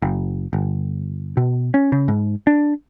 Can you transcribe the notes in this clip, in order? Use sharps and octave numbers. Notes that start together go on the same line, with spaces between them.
F#1
G1
B2
C#4
C#3
G#2
D4